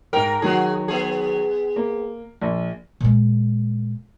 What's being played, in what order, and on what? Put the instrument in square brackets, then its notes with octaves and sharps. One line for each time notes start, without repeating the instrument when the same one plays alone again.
[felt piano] G#2 G5 [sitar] A#4
[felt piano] D#3 F#3 [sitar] F#4 G#4
[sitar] B3 G#4
[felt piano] A#3
A#1
[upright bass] A#2 G#3